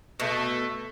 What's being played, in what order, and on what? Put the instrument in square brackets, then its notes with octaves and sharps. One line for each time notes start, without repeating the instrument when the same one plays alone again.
[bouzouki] B2 [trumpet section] A3